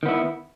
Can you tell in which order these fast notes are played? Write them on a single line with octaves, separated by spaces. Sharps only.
D#3 B3 E4